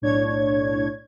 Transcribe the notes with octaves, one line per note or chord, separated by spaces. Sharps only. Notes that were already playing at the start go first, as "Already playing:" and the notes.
B1 A2 D4 C#5 G#6